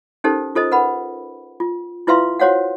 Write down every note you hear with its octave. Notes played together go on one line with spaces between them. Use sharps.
C#4 D#4 G4 A4 A#4 C5
F4 A4 C5 D#5
A#4 B4 F#5 B5
F4
E4 F4 B4 E5 F5 C6
F#4 C5 C#5 F5 F#5